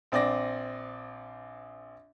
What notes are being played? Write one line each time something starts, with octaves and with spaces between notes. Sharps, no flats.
A#1 C4 D5 D6 A#6